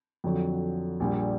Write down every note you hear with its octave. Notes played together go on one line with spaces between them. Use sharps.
F2 D3 F#3
A#1 A#2 G3